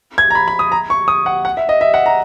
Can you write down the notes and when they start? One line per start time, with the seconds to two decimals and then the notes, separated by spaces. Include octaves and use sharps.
0.18 G#6
0.30 A#5
0.35 B5
0.48 B5
0.59 D#6
0.72 A#5
0.90 C#6
1.08 D#6
1.26 F#5
1.45 F#5
1.57 E5
1.69 D#5
1.81 E5
1.94 F#5
2.06 A#5